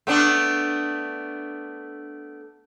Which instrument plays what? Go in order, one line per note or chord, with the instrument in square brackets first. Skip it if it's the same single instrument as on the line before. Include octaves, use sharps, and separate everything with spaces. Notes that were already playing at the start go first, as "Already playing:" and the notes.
[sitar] A3 B3 D4